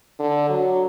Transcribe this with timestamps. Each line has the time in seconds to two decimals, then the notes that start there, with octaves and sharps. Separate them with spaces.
0.20 D3
0.49 F#3